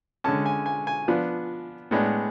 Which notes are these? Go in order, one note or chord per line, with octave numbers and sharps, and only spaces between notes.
D3 G#3 C#4 A5
G#5
G#5
G#5
F3 B3 D4
A2 G#3 B3 D4